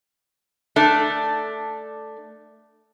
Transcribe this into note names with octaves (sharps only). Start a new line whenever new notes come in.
A3 D4 A4